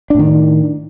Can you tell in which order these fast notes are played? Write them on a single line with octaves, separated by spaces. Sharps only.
D4 A2 D#3